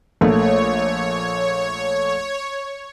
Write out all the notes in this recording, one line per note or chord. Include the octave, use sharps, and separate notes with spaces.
A#1 A3 A#3 C#5